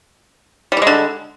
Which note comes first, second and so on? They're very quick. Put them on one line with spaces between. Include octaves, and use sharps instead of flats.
G3 E3 G#3 D3